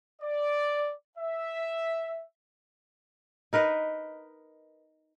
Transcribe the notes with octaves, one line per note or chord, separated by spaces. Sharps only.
D5
E5
D#4 A#4 B4 D#5